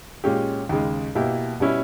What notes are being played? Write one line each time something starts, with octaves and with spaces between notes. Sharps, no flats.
A#2 G#3 C#4 G4
D#2 C#3 G#3
B2 A#3 E4 G4
B2 G3 C#4 E4